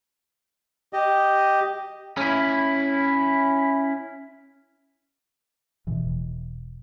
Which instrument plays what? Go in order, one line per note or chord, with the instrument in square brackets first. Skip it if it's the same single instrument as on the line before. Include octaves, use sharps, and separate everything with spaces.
[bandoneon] G4 D#5
[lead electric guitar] C#4 E4
[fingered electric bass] E1 B2 E3